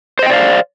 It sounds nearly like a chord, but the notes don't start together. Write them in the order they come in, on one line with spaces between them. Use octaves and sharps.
C5 D#5 G5 D5 F5